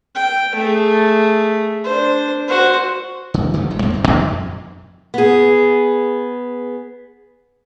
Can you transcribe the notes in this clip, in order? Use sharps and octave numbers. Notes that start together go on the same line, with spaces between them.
G5
A3 G#4
D4 C5
F#4 C5
C#3
D3 F#3 G3 A3
D1 G#3
E2 B2 F#3 A#3
D1 G2 D#3 C4
F2
B3 G#4